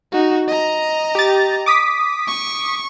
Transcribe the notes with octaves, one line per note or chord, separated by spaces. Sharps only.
D#4 F#4
D#5 A#5
G4 A6
D6 D#6 B6
C#6